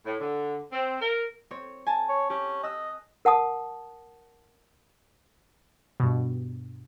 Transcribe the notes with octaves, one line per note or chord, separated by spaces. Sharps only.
A2
D3
C4
A#4
C4 C#5
G#5 A5
C#5
C#4 G4
D#5 E6 F#6
A#4 F#5 A5 D#6
G2 B2